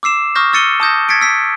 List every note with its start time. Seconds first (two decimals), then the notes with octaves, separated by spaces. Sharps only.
0.03 D6 E6 C7 E7
0.35 C#6 D#6 F6 G6 A#6
0.53 C#6 E6 A6 C#7 D#7 G7
0.80 A5 D#6 G6 A#6
1.09 G#6 A6 B6 C#7 D7
1.21 E6 B6